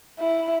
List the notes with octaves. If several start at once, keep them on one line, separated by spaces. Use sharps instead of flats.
E4